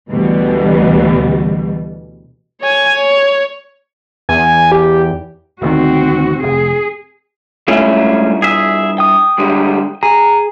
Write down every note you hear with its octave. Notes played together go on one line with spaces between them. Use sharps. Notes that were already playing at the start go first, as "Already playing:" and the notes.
D2 B2 E3 G3
C#5 G#5
C#5
E2 G#5
G4
E1 D2 D#3 C4 F#4
F1 G#4
G2 G#3 A3 C#4 E4 F4
G#4 E5 D#6
G5 D#6
D3 G3 G#3
G#4 A#5